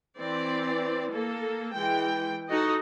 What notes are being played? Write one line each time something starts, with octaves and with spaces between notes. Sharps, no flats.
E3 C4 D5
A#3 A4
E3 G#3 G5
D#4 F#4 A4 D#5